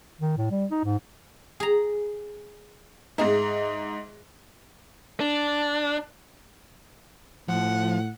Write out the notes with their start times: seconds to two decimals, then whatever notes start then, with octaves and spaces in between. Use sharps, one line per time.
0.21 D#3
0.37 A2
0.51 G3
0.71 D#4
0.84 G#2
1.60 G#4 A#5
3.18 G#2 D#4 G#4 E5
5.20 D4
7.48 A2 F3 F#5